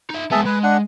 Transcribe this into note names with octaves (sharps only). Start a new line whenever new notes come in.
D#4 E5
G#3 B3 G#4 E5 A5
G#3 B4
D4 F#5